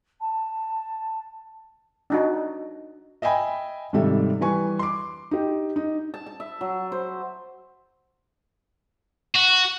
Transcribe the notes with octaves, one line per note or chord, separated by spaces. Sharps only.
A5
D4 D#4 F#4
D#5 E5 G5 G#5 B5
G#1 C3 D#3 G3 A4 E5
E3 G3 B4 G#5 C#6
C6 D6
D#4 G4
D#4
A5
A5
E5
F#3
C5
F#4